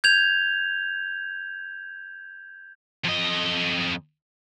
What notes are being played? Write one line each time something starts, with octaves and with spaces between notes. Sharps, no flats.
G6 G#6 F7
F2 D#5